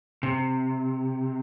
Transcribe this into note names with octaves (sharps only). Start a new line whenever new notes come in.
C3